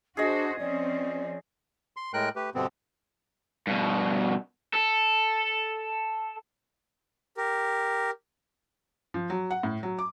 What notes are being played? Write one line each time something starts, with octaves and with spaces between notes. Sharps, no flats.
D4 F#4 G#4 C5 D#5
F3 C4 C#4 D5
C6
A2 G#3 A#4 G5 F#6
A3 G4 B4
G2 B2 D3 B3 C4
G2 B2
A4
G4 A#4
F3
F#3
F#5
A2
F#3
D6